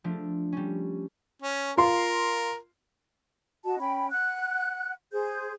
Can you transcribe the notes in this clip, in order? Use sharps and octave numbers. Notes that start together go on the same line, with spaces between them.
F3 A3 D4
G3 C#4
C#4
F4 A#4 C6
F#4 D#5 A5
C#4 G5 B5
F#5 F#6
G#4 C5 G6